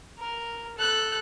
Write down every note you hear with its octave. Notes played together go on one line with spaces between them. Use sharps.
A#4
A4 F#6